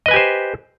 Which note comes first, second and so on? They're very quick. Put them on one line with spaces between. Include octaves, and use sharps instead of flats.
D#5 B4 G#5 G4 C5